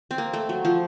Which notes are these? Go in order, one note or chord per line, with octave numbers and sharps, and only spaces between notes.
C4
A#3
A3
F#3
F3